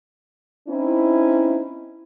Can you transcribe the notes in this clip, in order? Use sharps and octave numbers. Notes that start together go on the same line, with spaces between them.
C4 C#4 D#4 E4